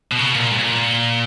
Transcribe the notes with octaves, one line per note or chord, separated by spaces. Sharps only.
B2
C#3
B2
A#2
G2
A#2